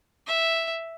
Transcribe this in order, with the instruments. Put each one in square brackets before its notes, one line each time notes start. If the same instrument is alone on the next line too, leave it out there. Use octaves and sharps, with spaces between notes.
[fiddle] E5